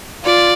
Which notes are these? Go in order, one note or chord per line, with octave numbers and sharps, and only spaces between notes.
F4 D5